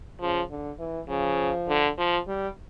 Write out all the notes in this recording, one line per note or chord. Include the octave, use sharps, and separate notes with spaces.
C#3 F3
D3
E3
C#3 F3
D3
F3
G3